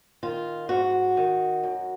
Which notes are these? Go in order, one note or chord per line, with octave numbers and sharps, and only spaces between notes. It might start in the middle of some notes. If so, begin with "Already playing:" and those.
D#3 F4
G#2 F#4
D#3
F#2